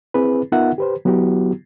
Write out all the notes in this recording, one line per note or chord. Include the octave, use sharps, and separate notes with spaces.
C4 E4 G#4 B4
B3 D#4 F4 A#4 E5 F#5
G4 B4 C5
F#3 B3 E4 F#4 G4